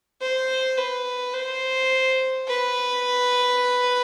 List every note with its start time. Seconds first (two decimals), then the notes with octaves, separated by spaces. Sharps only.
0.21 C5
0.77 B4
1.35 C5
2.48 B4